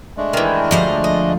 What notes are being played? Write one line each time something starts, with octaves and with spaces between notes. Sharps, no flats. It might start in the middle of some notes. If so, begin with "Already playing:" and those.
G#3 A3 D4
D#3 E3
D2 F3 G3 D#5 F5
D#5